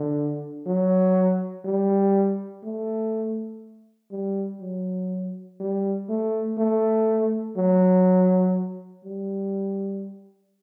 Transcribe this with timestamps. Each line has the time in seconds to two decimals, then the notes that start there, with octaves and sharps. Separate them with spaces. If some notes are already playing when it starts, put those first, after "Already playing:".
Already playing: D3
0.66 F#3
1.65 G3
2.63 A3
4.11 G3
4.61 F#3
5.60 G3
6.09 A3
6.58 A3
7.57 F#3
9.05 G3